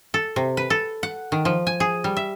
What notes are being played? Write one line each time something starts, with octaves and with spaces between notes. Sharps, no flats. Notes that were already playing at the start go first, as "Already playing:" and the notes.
A4
C3
B4
A4
F#5
D#3
F3
G#5
G#4
G3
E5